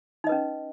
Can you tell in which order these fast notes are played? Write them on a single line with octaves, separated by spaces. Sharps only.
D#4 D#5 B4 C#4